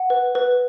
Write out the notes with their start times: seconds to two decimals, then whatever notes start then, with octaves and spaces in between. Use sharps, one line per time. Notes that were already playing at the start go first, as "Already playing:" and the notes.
Already playing: F#5
0.10 B4
0.35 B4